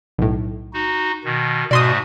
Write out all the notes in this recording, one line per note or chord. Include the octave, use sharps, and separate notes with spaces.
B1 A2
D#4 F#4
B2 D#3
G#2 B2 A3 F#4 D5 C6 D#6